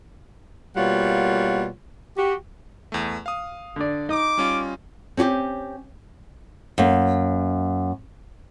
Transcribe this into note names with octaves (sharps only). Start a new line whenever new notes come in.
B2 G3 A#3 F4 C#5 F#5
F#4 G4
E2 A3
F5 D#6
D3 D5
D#4 D6
G3 C#4 F4
C4 C#4 F#4 G4
F#2 A#3